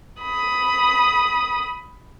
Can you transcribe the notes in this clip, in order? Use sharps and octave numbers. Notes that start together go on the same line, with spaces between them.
B5 D#6